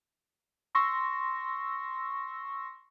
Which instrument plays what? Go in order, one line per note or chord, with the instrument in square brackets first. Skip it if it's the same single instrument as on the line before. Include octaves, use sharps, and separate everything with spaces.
[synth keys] C6 C#6 E6 A#6